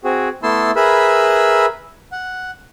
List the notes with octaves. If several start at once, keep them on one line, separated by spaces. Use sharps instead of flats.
C4 F#4 G#4
A3 B3 E4 A5 C6 E6
G#4 A#4 B4 E5 B5 E6
F#5